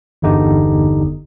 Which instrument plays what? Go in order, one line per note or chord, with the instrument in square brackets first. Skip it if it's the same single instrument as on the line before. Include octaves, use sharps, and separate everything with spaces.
[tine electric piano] G1 E2 D3 D#4 G4